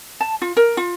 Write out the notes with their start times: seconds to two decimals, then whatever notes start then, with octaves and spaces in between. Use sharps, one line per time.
0.21 A5
0.42 F4
0.57 A#4
0.77 F4